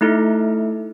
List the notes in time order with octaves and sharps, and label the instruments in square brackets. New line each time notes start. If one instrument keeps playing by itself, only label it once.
[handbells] A3 D#4 E4 A4